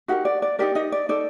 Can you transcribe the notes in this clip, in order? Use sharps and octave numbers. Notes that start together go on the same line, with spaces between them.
D#4 F#4 G4 A#4 F#5
D5
D5
D#4 G4 A#4 D5
D#4 D#5
D5
D#4 A4 D5